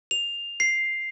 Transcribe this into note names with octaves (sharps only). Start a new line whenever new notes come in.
F7
C7